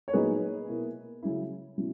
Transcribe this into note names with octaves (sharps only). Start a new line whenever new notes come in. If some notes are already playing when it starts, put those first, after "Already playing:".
C#5
A#2 F#3 B3 D#4 G#4 B4
B2 A#3 E4
C#3 F#3 C#4 E4
B2 F#3 C#4 E4